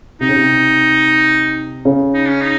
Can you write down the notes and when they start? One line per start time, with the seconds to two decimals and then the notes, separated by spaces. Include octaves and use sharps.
0.21 C3 D#4
0.29 C#3
0.36 C3
1.85 C#3
2.13 D#4
2.29 C#4
2.41 D#4